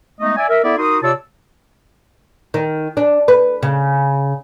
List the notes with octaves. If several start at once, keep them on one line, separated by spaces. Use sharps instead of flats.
G#3 A3 B3 D#4 D#5
D5 E5 G#5
A#4 E5
B3 E4 A4 D5 E5
D#4 F#4 A#4 C6 D#6
C3 F4 C#5 D5 A5 E6
D#3
D4
B4
C#3